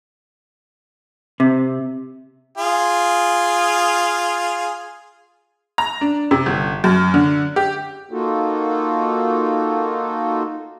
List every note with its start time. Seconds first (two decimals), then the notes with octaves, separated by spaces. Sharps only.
1.40 C3
2.57 F4 G#4
5.78 A#5
6.01 D4
6.31 C3
6.46 G1
6.84 F#2
7.14 D3
7.56 G4
8.11 A#3 D#4 F4 F#4 A4